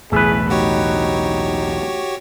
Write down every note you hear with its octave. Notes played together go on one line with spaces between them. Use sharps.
B1 E2 A2 A3 G#4 B4
D#4 F#4 G4 C#5